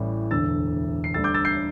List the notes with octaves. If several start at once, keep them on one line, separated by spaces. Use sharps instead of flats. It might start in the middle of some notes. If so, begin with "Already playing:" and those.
Already playing: A1 A2 E3 G3
E1 D2 D3 E6 A6
C7
D2 D3 G3 E6 A6
D6 G6
E6 A6
G6 C7